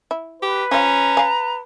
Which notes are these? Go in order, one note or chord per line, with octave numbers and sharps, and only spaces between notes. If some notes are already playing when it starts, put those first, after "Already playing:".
E4
G4 B4
F3 C#4 F4 A#5
F5 G#5